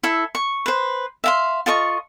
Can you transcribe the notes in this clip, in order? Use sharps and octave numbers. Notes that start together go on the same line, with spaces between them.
E4 A4
C#6
B4 C5
E5 F5 C6
F4 A4 D#5 C#6